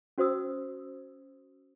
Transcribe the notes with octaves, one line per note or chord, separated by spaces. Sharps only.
C#4 F#4 C5 D5 D#6 E6